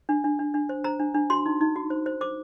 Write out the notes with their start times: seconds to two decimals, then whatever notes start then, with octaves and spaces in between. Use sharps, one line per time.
0.09 D4
0.24 D4
0.39 D4
0.54 D4
0.69 C5
0.84 C5 A#5
1.00 D4
1.14 D4
1.30 F#4 C6
1.46 D#4
1.61 D#4
1.76 F#4
1.90 C5
2.06 C5
2.21 C5 D6